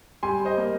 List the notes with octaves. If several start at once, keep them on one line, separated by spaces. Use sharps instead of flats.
G3 G#5 C6
C5 D#5
A#3